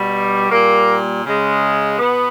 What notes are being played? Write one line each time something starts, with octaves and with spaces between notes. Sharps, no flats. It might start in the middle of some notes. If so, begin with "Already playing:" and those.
Already playing: B2 G3
A#2 G3 A#3
C#3 G#3
B2 B3